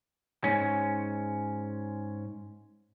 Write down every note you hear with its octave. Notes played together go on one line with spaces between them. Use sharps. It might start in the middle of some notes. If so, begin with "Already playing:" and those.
G#2 C#4